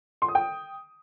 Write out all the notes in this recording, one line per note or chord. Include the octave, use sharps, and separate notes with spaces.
C6
D#6
G5